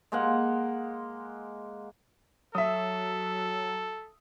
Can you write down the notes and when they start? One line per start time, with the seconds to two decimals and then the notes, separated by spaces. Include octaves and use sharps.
0.12 G#3 A#3 F#5
2.55 F#3 A4 E5 D#6